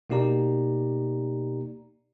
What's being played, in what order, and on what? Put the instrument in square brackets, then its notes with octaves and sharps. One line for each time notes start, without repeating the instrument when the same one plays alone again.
[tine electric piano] B2 A#3 D#4 G4 D5 A#5